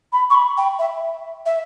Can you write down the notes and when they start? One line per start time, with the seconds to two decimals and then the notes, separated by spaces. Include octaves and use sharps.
0.12 B5
0.30 C#6
0.34 B5
0.57 G5
0.79 E5
1.45 E5